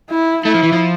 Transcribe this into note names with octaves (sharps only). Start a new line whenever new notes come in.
E4
A3 E4
F3
E3
F3